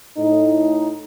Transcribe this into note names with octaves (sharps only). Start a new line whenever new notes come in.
A2 D#4